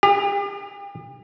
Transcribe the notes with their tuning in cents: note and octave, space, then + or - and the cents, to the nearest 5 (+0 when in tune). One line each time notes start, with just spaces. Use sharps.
G4 +40